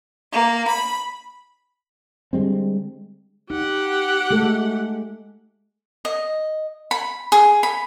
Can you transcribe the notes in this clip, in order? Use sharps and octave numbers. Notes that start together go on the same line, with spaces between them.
A#3
B5
D3 G3 G#3 C4
D#4 G4 F#5
G#3 A3 A4
D#5
B5
G#4
B5